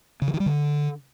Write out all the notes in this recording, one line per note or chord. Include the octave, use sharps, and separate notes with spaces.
C#3
E3
D#3
G3
D3